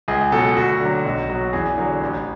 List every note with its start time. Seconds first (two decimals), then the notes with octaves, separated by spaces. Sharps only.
0.08 C#2 G#4
0.32 B2 F#3 A4
0.57 D2 F#4
0.81 D3 F#3
1.05 B1
1.29 B2 F#3
1.53 E2 G#4
1.78 D3 F#3
2.01 A1